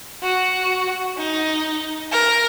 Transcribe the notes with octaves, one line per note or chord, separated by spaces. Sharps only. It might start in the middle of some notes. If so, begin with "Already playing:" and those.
F#4
D#4
A#4